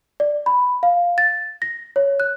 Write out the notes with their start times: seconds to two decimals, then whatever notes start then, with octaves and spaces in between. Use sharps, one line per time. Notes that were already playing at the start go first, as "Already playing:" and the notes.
0.20 D5
0.46 B5
0.83 F5
1.18 A6
1.62 A#6
1.96 C#5
2.20 F#6